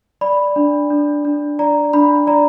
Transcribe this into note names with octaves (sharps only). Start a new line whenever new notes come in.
D5 B5
D4
D4
D4
D5 A#5
D4 B5
D5 A#5